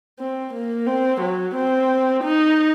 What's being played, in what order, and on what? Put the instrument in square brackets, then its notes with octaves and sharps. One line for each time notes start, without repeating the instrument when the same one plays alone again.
[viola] C4
A#3
C4
F#3
C4
D#4